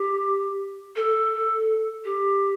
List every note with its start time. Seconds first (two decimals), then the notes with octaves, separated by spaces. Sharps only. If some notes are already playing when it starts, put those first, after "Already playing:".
Already playing: G4
0.96 A4
2.05 G4